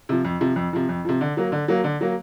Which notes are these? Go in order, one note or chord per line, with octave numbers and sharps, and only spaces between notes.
C3 F3
F2
C3 F3
F2
C3 F3
F2
C3 F3
D3
F#3 A#3
D3
F#3 A#3
D3
F#3 A#3